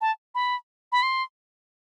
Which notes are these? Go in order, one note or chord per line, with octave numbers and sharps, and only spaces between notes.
A5
B5
B5
C6